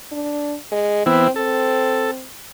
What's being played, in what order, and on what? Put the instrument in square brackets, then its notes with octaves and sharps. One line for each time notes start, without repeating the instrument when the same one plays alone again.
[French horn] D4
G#3
[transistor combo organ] E3 B3 E4 [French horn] C4
[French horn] C4 [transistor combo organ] A4